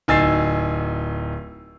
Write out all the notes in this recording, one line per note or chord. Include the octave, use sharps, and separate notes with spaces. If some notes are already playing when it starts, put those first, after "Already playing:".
D1 D#4 G#5 E6 A6 C7